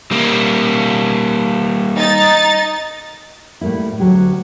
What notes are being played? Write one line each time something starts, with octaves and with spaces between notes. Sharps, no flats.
G3 A#3
D#4 A6
A2 G3 A#3 E4
D2 F#3 G4